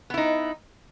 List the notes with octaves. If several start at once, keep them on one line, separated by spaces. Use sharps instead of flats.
B3 D#4 E4